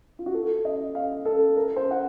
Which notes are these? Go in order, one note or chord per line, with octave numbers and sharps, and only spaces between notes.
F4
F#4
A4
D#5
F5
A4
A#4
C5
F#5